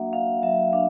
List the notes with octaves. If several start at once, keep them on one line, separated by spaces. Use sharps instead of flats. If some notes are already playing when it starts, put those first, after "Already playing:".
Already playing: F#3 A#3 D4 F#4 E5 F#5
F#4 F5
F#3 E5
D4 F5